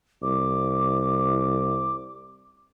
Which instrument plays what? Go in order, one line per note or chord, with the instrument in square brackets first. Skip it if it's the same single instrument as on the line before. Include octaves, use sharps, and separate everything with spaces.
[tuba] C2 [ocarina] D6